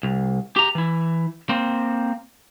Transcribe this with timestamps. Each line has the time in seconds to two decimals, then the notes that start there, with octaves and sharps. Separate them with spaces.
0.03 C2
0.56 G4 A#5
0.75 E3 E4
1.49 A#3 C4